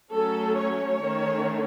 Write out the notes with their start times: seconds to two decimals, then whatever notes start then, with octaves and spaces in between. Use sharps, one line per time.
0.12 F#3 A3 C#4 A4
0.57 C#5
1.02 D#3 A3 C#4